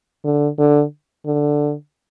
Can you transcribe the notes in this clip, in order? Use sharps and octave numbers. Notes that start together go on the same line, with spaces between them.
D3
D3
D3